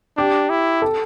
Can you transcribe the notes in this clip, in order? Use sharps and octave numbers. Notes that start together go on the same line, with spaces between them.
D4 G4
E4
A4